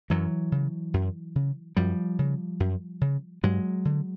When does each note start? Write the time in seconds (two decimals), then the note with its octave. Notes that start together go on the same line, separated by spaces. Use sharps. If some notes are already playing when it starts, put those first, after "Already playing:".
0.10 F#2 E3 F#3
0.52 C#3
0.94 F#2
1.35 C#3
1.77 F#2 F3 G3
2.19 C#3
2.60 F#2
3.01 C#3
3.43 G2 F#3 G#3
3.85 D3